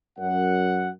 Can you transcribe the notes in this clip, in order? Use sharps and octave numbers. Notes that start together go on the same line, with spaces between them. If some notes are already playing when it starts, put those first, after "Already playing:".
F#2 F#5